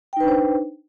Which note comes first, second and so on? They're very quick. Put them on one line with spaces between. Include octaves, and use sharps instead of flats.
G5 D#4 B4 D4 C5